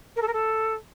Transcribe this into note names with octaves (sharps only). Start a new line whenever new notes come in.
A#4
A4
A#4
A4